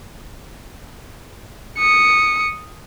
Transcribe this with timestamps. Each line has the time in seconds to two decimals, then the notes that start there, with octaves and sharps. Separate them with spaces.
1.78 D#6 C#7